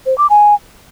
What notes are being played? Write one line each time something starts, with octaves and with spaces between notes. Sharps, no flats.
C5
D6
G#5